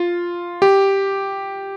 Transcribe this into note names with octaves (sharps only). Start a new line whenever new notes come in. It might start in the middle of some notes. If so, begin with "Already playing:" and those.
Already playing: F4
G4